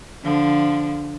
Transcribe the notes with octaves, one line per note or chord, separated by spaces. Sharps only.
D3 F3